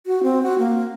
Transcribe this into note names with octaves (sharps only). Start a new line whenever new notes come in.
F#4
C4
F#4
A#3